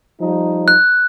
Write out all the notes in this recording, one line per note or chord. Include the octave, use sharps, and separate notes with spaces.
F3 G3 D#4
F#6